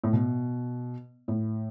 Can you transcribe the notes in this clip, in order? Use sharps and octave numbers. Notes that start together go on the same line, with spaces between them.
A2
B2
A2